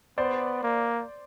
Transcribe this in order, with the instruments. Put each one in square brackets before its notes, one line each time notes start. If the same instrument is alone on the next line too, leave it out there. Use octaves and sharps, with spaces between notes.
[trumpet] B3 [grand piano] C5 D5
[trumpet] A#3